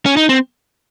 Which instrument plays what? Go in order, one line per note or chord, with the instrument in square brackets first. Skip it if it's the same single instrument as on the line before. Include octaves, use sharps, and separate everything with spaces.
[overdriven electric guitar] C#4
D#4
C4